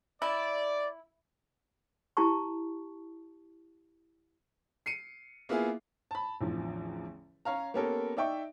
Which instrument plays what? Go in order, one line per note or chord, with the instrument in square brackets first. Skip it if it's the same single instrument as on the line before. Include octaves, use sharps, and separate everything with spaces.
[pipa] E4 [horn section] D5
[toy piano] E4 G4 A5 C#6
[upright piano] C7 C#7 D#7
A#3 B3 E4 F4 G#4
A5 B5
A1 E2 D3 F3
C#4 C#5 F5 A#5
A#3 B3 C#4 G4 A4 A#4
D#4 D5 E5 G5 C#6